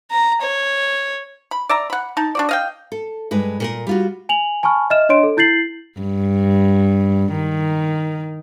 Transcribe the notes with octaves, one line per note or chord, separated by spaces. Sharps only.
A#5
C#5
B5
D5 E5 A#5
F#5 B5
D#4 A5
D4 F#4 D5
D#5 F5 G5
A4
G2 G#3 B4
A#2 A4 A#4
G3 F4 F#4
G#5 F7 F#7
G#5 A5 B5 C#6 F6
D#5 E5 F6 E7
D4 C#5 D#5 C6 D7
A4
E4 G6 A6 C7 F#7
G2
D#3